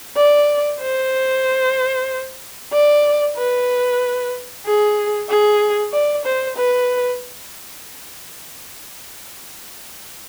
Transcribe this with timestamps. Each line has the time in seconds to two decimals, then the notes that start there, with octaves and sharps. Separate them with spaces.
0.16 D5
0.81 C5
2.72 D5
3.37 B4
4.66 G#4
5.29 G#4
5.93 D5
6.25 C5
6.57 B4